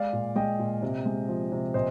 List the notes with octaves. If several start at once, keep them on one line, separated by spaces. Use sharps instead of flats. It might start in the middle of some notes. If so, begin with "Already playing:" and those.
Already playing: G#3 D5 F5
A#2
G#3 D#5 G5
A#2
C3
G#3
F3
C3
A#2 C5 D#5